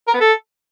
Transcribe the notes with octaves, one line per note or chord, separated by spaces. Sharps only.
A#4
B3
A4